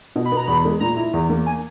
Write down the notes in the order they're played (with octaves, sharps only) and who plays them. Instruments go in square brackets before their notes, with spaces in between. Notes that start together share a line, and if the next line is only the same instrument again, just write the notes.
[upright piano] B2
[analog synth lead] B5
[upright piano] B3
[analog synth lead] A#5
[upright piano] E2 [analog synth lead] B5
[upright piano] G#3
[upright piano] A#2 [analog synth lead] A#5
[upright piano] E4
E2
A#3
[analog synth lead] G#5